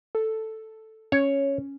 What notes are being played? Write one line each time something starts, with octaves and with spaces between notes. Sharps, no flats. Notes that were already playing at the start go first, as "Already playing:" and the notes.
A4
C#4 C#5